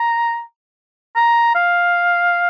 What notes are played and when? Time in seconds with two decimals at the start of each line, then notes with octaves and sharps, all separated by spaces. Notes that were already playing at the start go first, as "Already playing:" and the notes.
Already playing: A#5
1.16 A#5
1.55 F5